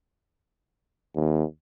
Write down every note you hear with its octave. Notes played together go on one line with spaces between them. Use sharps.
D#2